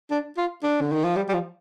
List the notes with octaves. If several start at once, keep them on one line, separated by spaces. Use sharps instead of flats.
D4
F4
D4
D3
D#3
F3
G3
G3
F3